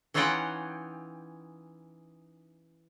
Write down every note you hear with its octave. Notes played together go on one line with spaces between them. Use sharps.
E3 C#4 D#4 F4 F#5 G5